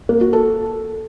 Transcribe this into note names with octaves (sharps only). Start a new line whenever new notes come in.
A#3
F#4
A4